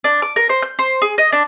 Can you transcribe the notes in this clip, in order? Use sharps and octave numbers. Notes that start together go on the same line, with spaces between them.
D4
D6
A#4
C5
G6
C5
G#4
D#5
D4